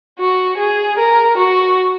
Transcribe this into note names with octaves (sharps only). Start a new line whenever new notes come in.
F#4
G#4
A#4
F#4